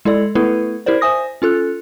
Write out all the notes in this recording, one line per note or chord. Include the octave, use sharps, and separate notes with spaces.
G#3 E4 A4 D5
A3 B3 E4 A4 B4
E4 G4 A#4 C5 D5
C5 E5 G#5 D#6 A#6
C#4 F4 A4 F#6